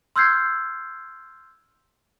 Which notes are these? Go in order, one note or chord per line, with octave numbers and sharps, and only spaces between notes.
C6 E6 F6 G6 G#6 C7